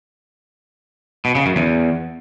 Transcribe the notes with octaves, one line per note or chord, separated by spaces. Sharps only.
B2
C#3
F#2
E2